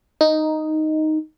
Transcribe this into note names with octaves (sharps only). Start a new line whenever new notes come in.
D#4